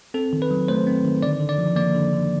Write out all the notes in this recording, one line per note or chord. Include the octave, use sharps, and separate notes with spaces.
C4 A4
D#3
B4
F#3
A3 C5
C4
D#3
D3 D5
D3
D5
F3
A#3 D5
D3
D3